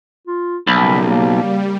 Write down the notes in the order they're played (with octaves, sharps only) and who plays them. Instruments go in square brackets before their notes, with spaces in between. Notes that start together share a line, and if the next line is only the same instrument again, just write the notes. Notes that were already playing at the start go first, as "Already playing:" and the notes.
[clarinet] F4
[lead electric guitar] B1 [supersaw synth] C#3 G3 A#3 [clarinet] B5
[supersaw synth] G3 [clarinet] A#3